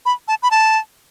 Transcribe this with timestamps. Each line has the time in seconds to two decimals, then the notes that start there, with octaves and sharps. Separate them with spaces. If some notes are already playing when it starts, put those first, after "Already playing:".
0.06 B5
0.28 A5
0.43 B5
0.51 A5